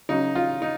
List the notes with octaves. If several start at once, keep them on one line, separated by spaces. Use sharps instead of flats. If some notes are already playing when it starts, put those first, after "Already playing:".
C#3 F#3 D#4
F4
D#4